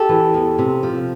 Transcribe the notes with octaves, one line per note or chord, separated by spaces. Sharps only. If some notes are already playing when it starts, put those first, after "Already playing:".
Already playing: G4 A4
E3
E2
C3
F3